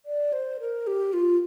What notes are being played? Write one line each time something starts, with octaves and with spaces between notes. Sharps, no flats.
D5
C5
A#4
G4
F4